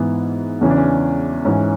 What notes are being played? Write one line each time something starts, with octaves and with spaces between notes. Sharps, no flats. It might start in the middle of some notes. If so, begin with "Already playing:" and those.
Already playing: G#2 E3 B3
E2 C#3 E3 C#4
D4
C#4
G#2 E3 C#4